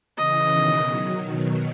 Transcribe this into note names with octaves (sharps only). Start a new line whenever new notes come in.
C#3 E3 D#5
B2 D#3
D#3 F#3
B2 D#3